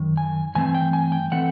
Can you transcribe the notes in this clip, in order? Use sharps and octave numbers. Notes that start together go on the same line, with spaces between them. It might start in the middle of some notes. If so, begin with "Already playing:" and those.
Already playing: F#2 D#3
G#5
G2 E3 A3 C4 G#5
G5
G#5
G5
E3 A3 C4 F#5